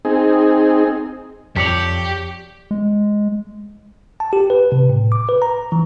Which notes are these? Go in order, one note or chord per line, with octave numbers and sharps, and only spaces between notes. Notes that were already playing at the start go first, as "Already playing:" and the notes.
C4 D#4 G#4
F2 F3 G4 C#5 D5
G#3
A5
G4
B4
C3
A2
D6
B4
A#5
E3